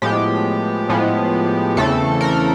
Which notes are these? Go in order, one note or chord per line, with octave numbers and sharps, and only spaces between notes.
A2 F3 G#3 B3 G4
A2 F3 G#3 B3
E2 C#3 E3 A3 C4 A4
A#4